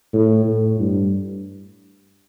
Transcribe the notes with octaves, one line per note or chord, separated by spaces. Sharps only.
A2
A2
G2